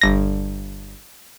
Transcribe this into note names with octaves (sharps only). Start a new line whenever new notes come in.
G1 A#6